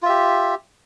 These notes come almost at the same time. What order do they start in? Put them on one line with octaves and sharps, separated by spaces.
F4 E5 G4